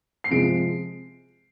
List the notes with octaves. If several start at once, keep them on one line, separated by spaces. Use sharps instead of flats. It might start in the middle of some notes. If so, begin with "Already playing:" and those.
C7
C3 F3 G#3 D7